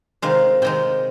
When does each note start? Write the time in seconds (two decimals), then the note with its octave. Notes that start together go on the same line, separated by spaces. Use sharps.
0.22 C3 D#3 G#3 F5
0.62 C3 D#3 G#3 G5